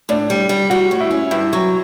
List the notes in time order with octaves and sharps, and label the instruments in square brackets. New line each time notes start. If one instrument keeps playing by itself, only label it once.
[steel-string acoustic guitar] A2 [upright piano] D4
[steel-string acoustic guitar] G3
G3
[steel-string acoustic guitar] G3 [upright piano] F#4
[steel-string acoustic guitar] A2
[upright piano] E4
[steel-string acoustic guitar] C#4
[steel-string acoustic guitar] G2 [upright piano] E4
[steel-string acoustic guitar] F#3